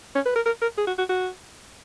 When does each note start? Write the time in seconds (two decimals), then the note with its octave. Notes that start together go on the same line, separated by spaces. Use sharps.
0.15 C#4
0.26 B4
0.36 A#4
0.46 A#4
0.62 A#4
0.77 G#4
0.87 F#4
0.98 F#4
1.09 F#4